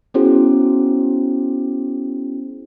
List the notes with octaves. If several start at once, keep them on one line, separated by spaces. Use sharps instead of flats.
B3 C#4 E4 F#4 G#4 C5